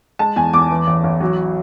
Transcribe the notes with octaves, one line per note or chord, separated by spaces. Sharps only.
G#3 A5
E2 G#5
E2 D6
E3
A1
A1
F#3